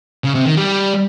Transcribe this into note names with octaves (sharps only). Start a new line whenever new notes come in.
C#3
C3
D#3
G3